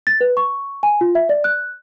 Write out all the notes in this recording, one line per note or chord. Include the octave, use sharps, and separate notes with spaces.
A6
B4
C#6
G#5
F4
E5
D5
F#6